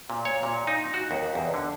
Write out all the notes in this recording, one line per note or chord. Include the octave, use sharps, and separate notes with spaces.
A#2
C#5
A#2
D#4
F#4
D#2
E2
D3